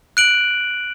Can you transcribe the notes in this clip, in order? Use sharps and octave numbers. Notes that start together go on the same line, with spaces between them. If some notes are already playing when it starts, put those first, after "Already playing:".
F#6 D7 F#7